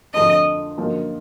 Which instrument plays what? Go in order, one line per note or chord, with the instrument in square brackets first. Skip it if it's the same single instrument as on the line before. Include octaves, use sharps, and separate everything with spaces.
[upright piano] F2 D3 F3 A3 D4 [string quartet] D#5
[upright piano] F#2 D3 F3 A#3 D#4